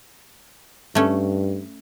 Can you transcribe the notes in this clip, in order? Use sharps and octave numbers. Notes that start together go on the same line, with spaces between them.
G2 A3 C#4